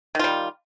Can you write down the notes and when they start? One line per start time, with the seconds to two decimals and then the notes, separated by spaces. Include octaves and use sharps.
0.15 D#3
0.19 F4
0.24 G3